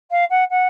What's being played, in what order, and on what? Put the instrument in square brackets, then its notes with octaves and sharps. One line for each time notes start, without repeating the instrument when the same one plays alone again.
[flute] F5
F#5
F#5